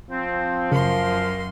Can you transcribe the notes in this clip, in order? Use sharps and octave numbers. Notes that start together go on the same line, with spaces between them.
F3 C4
F#2 C#3 A#4 F5 C6